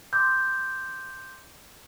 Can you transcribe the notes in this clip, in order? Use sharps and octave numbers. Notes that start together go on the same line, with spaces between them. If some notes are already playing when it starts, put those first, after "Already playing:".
C6 D6 E6 G6